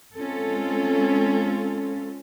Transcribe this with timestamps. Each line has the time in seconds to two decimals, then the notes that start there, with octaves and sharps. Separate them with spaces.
0.16 G#3 C4 C#4 F4 A4